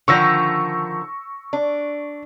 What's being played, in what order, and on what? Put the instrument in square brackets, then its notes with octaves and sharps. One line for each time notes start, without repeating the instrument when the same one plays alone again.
[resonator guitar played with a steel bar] D3 D#3 F3 [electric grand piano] C#6 E6 A#6
[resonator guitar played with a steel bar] D4